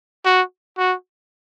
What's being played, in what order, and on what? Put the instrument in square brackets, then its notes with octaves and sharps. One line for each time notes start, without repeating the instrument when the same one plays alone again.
[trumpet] F#4
F#4